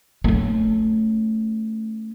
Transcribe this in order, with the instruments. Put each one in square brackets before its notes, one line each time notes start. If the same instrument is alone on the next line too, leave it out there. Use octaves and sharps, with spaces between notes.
[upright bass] A3 C#4